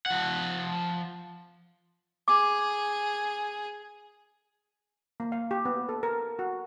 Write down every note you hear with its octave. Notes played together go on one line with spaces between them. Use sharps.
F3 F#5
G#4 D6
A#3
F5
G4
B3
A4
A#4
F#4